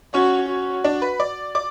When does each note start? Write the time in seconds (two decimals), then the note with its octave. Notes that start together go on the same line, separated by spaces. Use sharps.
0.14 C#4 F#4 C#5
0.49 F#4
0.84 D4 D5
1.02 B4 B5
1.20 D5 D6
1.55 D5 D6